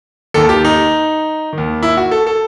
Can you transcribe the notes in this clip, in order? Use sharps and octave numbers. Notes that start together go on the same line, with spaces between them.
D#2 D#3 A4
G4
D#4
D#2 D#3
E4
F#4
A4
A4